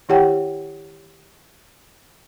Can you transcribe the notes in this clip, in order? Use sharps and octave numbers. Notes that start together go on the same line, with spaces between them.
D#3 E4 G4 C#5 F#5 G5